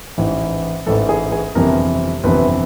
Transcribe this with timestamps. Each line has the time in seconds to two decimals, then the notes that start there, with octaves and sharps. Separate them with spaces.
0.18 A1 G#2 E3
0.87 A1 G#2 E3 A4
1.09 G#4
1.32 G#4
1.55 G1 F2 C3 E3 A#4
2.24 G1 F2 C3 E3 B4